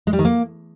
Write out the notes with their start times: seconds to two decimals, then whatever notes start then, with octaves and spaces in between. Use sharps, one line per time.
0.07 G#3
0.13 G3
0.19 D#3
0.25 A#3